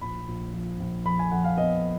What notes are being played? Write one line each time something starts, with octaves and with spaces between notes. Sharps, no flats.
A#1 B5
A#1
F3
A#1
F2 B5
G#5
F2 F#5
F5
B3 D#5